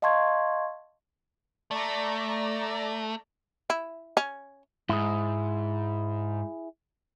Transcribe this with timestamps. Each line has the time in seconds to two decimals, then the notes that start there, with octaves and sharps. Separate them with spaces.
0.02 D#5 F5 A5 C6 C#6 G#6
1.71 A3 D5 A#5
3.70 E4
4.17 C#4
4.89 G#2 E4 G#4